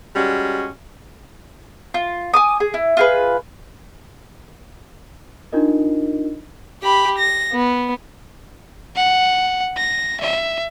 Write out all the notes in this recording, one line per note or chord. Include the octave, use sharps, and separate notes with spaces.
G3 G#3 C#4 F#4
F4
G#5 D6 D#6
G#4
E4
F4 G#4 B4
D4 D#4 F4 A#4 D#5
G4 B5
A#6
B3
F#5
A#6
E5